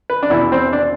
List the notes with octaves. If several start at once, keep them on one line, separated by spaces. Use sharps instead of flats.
B4
D4
E2 B2 B3 E4
C4
D4